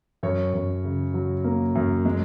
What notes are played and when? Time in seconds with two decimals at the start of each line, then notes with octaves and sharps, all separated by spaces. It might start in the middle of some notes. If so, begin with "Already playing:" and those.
0.23 F#2 C#5
0.53 F#2
0.84 C#3
1.14 F#3
1.44 A#3
1.75 F#2
2.05 G#3